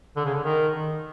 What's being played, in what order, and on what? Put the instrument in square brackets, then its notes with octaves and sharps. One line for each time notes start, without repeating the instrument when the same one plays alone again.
[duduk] D3
C#3
D3
D#3